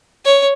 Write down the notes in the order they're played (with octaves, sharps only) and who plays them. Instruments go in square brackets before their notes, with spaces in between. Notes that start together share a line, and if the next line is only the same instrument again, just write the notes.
[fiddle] C#5